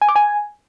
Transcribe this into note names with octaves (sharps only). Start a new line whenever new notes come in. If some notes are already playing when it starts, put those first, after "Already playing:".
G#5
D6
G#5